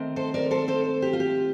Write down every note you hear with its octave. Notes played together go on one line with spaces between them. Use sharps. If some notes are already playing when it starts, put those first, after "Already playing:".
Already playing: D#3 A3 C4
A4 C5
A#4 D5
A4 C5
A4 C5
G4
F4
G4